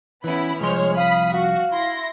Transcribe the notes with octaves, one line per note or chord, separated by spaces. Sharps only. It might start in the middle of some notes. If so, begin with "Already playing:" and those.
E3 B3 C#4 E4 B5
C2 F3 G#3 C5 C#5 C6 F6
F5 B5 D#6 B6
F#4 F5
E4 C6 A#6